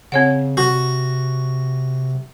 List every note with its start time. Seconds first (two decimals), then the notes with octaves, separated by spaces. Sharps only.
0.12 C#3 C4 C#5 F#5
0.57 C3 F#4